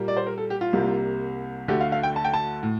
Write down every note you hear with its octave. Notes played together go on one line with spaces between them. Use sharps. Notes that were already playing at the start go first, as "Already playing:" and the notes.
Already playing: A#2 G3 A#3
D5
C5
A#4
A4
G4
F4
C2 C3 G3 A#3
D2 D3 A3 G4
F5
F5
G5
A5
G5
A5
A2